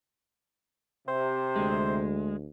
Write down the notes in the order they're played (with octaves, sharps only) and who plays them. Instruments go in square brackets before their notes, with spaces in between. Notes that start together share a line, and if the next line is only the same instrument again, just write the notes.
[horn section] C3 [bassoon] C5
[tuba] D2 [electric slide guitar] G#3